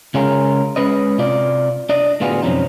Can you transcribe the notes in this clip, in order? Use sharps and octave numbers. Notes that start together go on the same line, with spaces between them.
C#3 G#3 C#4 F4 G#4 A#4
G#3 C#4 B4 D#5
C3 F4 D5
D4 D5 D#5
A2 D3 B3 F4 F#4 G#4
F#2 C3 F3 C#4 D#4